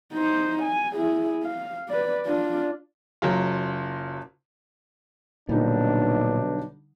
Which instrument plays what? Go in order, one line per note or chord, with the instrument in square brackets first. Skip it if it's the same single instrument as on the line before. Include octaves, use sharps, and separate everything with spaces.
[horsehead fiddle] D#4 C5
G#5
E4 G#4
F5
B4 D5
D4 F4
[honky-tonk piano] F#1 F#3 F4
[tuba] B1 [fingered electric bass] A#2 [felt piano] D3 G3 D#4 [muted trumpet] D4